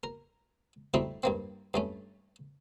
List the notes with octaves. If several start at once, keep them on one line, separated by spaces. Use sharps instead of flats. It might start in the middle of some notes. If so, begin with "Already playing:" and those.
A#4
G3 A3 C4 D#4 E4
G2 A#3 C4
G2 A3 C#4